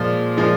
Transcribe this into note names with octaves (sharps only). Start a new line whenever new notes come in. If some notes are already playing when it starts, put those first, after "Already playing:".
Already playing: A#2 F3 G#3
A#2 F3 G#3